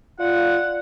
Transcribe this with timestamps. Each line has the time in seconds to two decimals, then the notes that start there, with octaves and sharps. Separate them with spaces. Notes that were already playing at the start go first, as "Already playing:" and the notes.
0.19 F4 D5 F#5